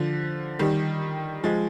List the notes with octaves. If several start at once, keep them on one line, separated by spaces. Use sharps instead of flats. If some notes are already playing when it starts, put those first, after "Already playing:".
Already playing: D3 F3
D#3 G3
F3 G#3